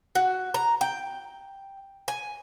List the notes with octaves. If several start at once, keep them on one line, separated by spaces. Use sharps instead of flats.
F#4
A#5
G5
G#5